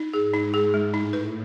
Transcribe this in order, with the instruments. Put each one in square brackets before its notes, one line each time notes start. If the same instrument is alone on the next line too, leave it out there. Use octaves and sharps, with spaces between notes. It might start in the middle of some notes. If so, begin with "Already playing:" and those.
Already playing: [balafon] D#4
[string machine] G#2 [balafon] G#4
[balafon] D#4
G#4
G#3
[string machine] A2 [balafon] D#4
[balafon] B4